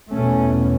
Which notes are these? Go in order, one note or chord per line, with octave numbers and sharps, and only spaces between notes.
E2 B2 A3 C#4